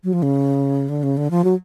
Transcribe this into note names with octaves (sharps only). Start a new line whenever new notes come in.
F#3
F3
C#3
D3
C#3
D3
F3
F#3